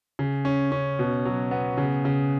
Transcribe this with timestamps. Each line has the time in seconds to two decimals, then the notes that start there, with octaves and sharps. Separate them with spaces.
0.19 C#3
0.45 C#4
0.72 C#4
0.99 B2
1.25 F#3
1.51 B3
1.78 C#3
2.05 C#3